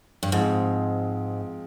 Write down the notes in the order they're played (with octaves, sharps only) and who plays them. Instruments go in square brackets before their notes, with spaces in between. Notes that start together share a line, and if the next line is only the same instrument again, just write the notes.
[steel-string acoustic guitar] G2
[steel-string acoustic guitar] G#2 [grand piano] F3 G#3 C4